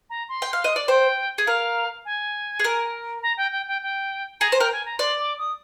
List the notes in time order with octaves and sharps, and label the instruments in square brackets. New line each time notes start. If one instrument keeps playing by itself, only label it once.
[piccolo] A#5
C6
[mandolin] G5
F5
D#5
D5
[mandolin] C5 [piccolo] G5
[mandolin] G#4
[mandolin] A#4 [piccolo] F5
[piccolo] G#5
[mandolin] G#4
A#4
[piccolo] A#5
G5
G5
G5
G5
[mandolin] G#4 [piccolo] A#5
[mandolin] C5
[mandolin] A#4 [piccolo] G5
[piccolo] G#5
A#5
[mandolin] D5 [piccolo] C6
[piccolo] D6
D#6